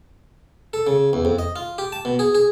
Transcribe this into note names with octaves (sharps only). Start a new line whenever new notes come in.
A4
C#3
E2
F2
D#5
F4
G4
A5
B2
G#4
G#4